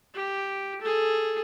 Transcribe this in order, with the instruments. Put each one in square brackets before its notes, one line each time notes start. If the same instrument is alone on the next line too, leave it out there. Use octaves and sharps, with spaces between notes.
[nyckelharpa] G4
G#4 A4